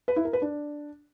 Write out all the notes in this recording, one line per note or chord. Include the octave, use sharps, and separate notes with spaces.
B4
E4
A#4
B4
D4